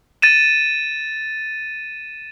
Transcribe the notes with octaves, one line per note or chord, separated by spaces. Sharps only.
A6 D#7 E7